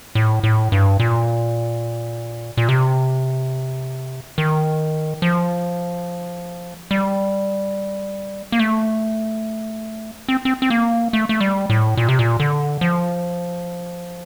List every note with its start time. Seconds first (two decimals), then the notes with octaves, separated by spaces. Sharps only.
0.15 A2
0.43 A2
0.72 G2
1.00 A#2
2.57 A#2
2.69 C3
4.38 D#3
5.22 F3
6.91 G3
8.52 A#3
8.59 A3
10.29 C4
10.45 C4
10.62 C4
10.70 A#3
11.13 A3
11.29 A3
11.40 G3
11.70 A2
11.97 A#2
12.09 C3
12.19 A#2
12.40 D3
12.81 F3